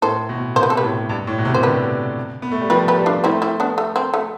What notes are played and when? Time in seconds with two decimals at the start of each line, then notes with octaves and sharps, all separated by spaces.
0.02 A2 A4 C5
0.29 B2
0.56 C3 C5
0.63 B4
0.70 A4
0.77 G4 B4
0.83 A2
1.09 G2
1.27 A2
1.38 B2
1.45 C3
1.54 C5
1.63 D3 G4 B4
2.42 B3
2.51 A3
2.61 G3
2.70 F3 G4 B4
2.88 G4 B4
2.97 G3
3.06 D4 F4
3.24 A3 C4 E4
3.42 C4 E4
3.60 B3 D4
3.78 A3
3.96 C4
4.14 A3